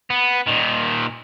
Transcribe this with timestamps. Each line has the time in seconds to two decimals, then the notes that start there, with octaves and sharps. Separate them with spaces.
0.10 B3
0.47 A#2 D#3